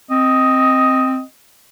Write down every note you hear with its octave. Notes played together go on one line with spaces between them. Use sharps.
C4 D#5